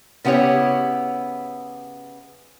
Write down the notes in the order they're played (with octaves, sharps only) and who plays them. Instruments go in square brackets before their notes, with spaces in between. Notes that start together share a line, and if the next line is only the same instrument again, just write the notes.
[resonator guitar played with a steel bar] C#3 B3 E4 G4 C#5